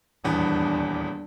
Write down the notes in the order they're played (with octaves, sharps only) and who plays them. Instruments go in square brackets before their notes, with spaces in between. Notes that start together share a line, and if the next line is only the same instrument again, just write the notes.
[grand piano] D#1 E2 B3 [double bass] G3 D4